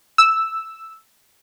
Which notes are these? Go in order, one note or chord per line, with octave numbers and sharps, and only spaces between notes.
E6